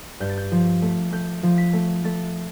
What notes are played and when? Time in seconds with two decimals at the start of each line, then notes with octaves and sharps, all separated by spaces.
0.20 G2 G6
0.29 A6
0.37 G6
0.52 F3
0.82 A3
1.12 A3 G6
1.43 F3
1.58 B6
1.73 A3
2.04 A3 A6